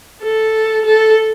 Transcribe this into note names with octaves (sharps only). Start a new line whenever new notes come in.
A4
A4